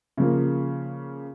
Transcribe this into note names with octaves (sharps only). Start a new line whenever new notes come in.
C#3 F3 A#3